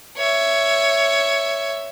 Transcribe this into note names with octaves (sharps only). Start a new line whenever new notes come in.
C#5 E5